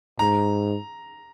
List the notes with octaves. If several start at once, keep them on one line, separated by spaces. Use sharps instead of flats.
G#2 A#5